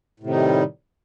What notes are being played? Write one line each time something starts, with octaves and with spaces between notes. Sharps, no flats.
A2 C3 D#3 G3 D#4